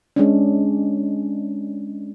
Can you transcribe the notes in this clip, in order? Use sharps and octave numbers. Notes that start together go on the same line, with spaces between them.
G#3 C#4 D4